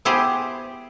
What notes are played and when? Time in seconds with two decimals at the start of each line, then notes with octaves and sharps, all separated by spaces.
0.05 B3 E4 G4 G#4 C5